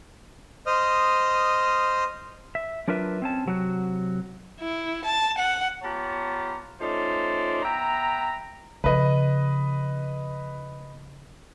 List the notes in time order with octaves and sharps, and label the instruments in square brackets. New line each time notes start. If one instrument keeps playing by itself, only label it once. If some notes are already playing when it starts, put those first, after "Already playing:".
[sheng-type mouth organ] C5 D#5 D#6 F6
[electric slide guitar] E5
F#3 D4 F4 A#4 B4 E5
C4 C#4 A5
C3 F#3 F#4
[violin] E4
A5
F#5
[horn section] B3 F4 G4 C#5 A5 A#5
A3 C#4 D#4 F4 C5 D5
B3 E5 G5 A#5
[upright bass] C#3 F3 [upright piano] B4 D#5